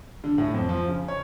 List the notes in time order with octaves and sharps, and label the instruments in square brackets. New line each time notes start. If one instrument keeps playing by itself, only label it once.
[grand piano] D3
A2
F2
F3
C#3
C#5